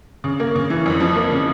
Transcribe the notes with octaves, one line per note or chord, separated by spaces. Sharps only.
C#3
A#3
C#3
E3
F2
F3
A#3
C#3